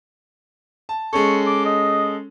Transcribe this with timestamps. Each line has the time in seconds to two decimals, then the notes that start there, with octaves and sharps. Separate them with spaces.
0.89 A5
1.13 G#3 C#4 A4 C#6
1.46 D6
1.65 D#5